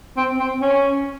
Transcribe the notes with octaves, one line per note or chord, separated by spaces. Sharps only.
C4
C4
C#4